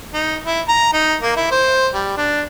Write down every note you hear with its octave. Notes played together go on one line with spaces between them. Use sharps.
D#4
E4
A#5
D#4
A#3
E4
C5
G3
D4